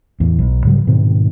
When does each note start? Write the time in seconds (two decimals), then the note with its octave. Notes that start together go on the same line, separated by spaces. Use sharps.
0.20 E2 A2
0.39 B1
0.65 G#2 C#3 F#3 G3
0.87 G#2 B2 D#3 C4